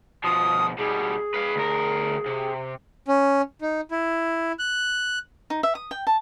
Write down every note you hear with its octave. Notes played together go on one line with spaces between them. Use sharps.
B2 F3 D#6
B2 G3 G#4
B4 F5
D2 A#4
C3
C#4
D#4
E4
F#6
D#4
E5
D#6
G5
A5